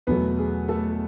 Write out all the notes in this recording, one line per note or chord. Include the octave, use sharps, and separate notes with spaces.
E2 B2 F#3 A3 B3 B4
G#4
A3 A4